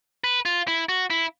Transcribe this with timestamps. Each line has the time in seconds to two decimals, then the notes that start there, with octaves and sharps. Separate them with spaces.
0.24 B4
0.45 F4
0.68 E4
0.89 F#4
1.10 E4